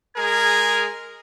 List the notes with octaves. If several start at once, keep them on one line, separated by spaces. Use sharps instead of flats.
G#3 G#4 A#4 G#6